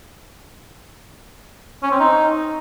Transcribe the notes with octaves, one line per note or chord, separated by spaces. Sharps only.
C#4
C4
D#4